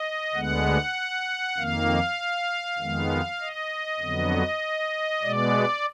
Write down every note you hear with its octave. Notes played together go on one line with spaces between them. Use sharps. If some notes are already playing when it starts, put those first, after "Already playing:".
Already playing: D#5
D2 D3 G#3 B3 F#5
F2 D#3 A#3 F5
F2 D#3 G#3 B3
D#5
F2 D3 F#3 B3
B2 G#3 B3 D5